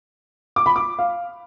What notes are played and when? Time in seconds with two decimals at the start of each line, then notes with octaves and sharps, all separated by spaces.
0.56 D6
0.66 B5
0.76 D6
0.99 F5